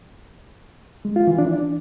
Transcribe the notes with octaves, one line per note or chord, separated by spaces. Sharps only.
G#3
F4
E3
D4